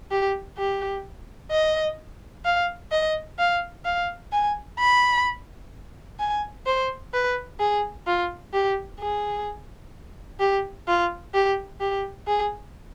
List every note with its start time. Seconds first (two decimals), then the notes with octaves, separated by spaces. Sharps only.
0.11 G4
0.58 G4
1.51 D#5
2.45 F5
2.92 D#5
3.39 F5
3.85 F5
4.32 G#5
4.79 B5
6.20 G#5
6.66 C5
7.14 B4
7.60 G#4
8.07 F4
8.53 G4
9.00 G#4
10.40 G4
10.87 F4
11.34 G4
11.81 G4
12.27 G#4